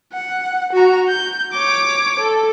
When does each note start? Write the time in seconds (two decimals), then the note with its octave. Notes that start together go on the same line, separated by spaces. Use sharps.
0.13 F#5
0.72 F#4 A#5
1.08 G6
1.52 C#5 D6
2.19 A4